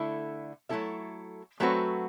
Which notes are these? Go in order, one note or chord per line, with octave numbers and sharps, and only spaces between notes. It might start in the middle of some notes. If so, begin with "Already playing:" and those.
Already playing: D3 A3 E4 A4
F#3 A3 E4 A4 E5
F#3 A3 C4 F#4 B4